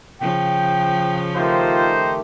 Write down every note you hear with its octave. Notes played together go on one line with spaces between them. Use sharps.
C#3 F3 G5
D#3 A3 D#4 F4 G4 C5